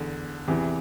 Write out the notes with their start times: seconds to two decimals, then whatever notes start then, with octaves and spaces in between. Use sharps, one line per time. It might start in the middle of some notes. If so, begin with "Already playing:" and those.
Already playing: E2 D3
0.48 E2 C3 E3